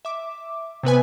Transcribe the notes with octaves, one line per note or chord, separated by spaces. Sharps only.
E5 D6
C3 B3 B4 G#5